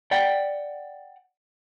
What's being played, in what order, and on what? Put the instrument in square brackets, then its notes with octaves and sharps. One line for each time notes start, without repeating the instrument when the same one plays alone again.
[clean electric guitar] D5 F#5 G5